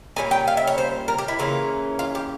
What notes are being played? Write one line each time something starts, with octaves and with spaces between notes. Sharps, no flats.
A#2 G3 C#4 G#5
G5
F5
E5
C#5
C5
A#4
G4
E4
C#3 E3 A#3 C#4 F4
F4
G4